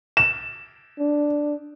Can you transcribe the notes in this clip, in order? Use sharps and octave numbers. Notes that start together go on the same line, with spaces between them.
E7
D4